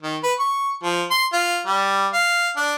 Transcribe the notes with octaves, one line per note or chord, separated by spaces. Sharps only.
D#3
B4
C#6
F3
C6
F4
G3
F5
D4